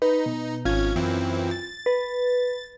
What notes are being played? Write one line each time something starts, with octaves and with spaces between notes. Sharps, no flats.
D#4 B4
B2
G#1 C#4 F4 G#6
F#2 E3 C4
A6
B4